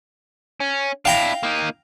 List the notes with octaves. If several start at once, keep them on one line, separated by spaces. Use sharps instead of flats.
C#4
D4 E4 F5 G5 A#5
A#3 D#4